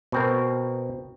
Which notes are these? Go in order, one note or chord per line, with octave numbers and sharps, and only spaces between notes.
B2 C4 A#4